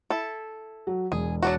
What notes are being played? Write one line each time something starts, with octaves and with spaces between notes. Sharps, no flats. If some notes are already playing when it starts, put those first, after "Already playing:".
E4 A4
F#3
E1 G#4
F#3 D4 F#4